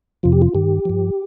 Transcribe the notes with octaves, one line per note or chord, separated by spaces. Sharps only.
F2 C3 F3 F4
G4
F4
G2 D#3 G4
G2 F3